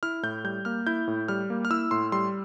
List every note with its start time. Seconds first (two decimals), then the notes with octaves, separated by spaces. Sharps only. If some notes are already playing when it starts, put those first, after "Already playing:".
0.03 E4 F6
0.23 A2 G6
0.44 G3 G6
0.65 A#3 F6
0.87 E4 G6
1.07 A2
1.28 G3 F6
1.50 A#3
1.65 F6
1.70 E4 E6
1.91 A2 C6
2.12 G3 C6